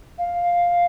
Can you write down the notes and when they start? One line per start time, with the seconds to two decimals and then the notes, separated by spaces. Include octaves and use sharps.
0.18 F5